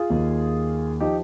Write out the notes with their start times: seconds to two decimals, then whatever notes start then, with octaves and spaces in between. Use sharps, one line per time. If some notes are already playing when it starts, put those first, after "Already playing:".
Already playing: F4 G#4
0.10 D#2 D#3
1.00 F3 D#4 G4